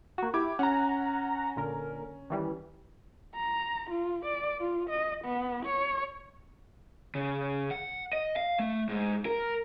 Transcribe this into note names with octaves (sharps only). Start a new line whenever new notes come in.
A#3 F#4
E4 G4 D6 G#6
C#4 F#5 A#5
A#2 D3 A#4
D#3 E3 G3
A#5
F4
D5
F4
D#5
B3
C#5
C#3
F#5
D#5
F5
A3
G#2
A#4